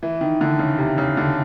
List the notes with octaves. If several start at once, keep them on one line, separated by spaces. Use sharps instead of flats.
E3
D#3
D3
C#3
C3
C#3
D3